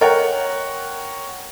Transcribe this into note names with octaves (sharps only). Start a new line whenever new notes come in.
A#4 C#5 F#5 G5